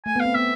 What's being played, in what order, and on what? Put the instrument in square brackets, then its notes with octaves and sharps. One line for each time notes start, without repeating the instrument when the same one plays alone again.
[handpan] A3 [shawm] G#5
[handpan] B3
[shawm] F5
[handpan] C4
[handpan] B3 [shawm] E5